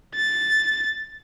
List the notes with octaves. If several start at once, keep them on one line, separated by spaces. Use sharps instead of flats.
A6